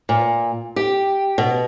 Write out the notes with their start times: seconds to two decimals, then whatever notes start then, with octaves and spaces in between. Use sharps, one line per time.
0.09 A#2
0.76 G4
1.38 B2